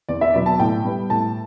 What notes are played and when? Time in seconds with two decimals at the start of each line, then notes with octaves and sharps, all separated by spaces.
0.09 E2 D5
0.21 E5
0.33 B2 F#3 B3 D5
0.46 A5
0.60 A2 G5
0.84 G3 B3
1.10 A2 A5